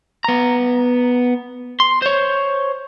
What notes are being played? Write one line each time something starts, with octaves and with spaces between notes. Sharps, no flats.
B3 A#5
C6
C5 C#5